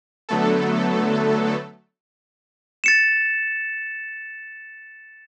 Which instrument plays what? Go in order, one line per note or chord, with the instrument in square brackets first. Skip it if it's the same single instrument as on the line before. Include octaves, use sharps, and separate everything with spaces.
[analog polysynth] D3 F#3 A3 B3 A4
[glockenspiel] A6 C#7 E7